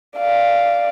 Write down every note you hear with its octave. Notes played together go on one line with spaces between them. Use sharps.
D5 F5